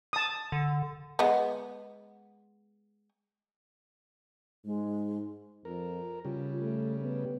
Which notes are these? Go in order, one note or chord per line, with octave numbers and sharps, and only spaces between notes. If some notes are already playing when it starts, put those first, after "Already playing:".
A5 D#6
D3
G#3 B3
G#2 G#3
F2 A#4
C#3 G3 F4
A3
B3